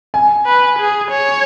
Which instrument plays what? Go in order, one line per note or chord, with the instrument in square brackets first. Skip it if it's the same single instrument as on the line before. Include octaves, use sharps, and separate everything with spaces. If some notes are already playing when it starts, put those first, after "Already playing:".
[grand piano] G#5
[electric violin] B4
G#4
C#5